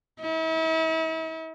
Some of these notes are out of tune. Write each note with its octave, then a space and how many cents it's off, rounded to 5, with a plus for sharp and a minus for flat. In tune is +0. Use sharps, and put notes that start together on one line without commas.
E4 -40